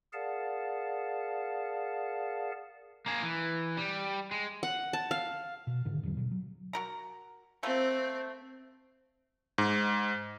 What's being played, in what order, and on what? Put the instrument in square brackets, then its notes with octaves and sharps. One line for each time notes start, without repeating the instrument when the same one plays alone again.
[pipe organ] G#4 A#4 D5 F5 F#5 A5
[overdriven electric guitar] A#3 G#4
E3
G3
G#3
[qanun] F#5
A5
F5
[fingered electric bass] B2
G#2 D3 D#3
E2 D3 D#3 F#3
B2 F3 F#3
F#3
[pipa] F#4 A#4 A#5
[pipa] A3 A#3 F4 [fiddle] C4
[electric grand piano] G#2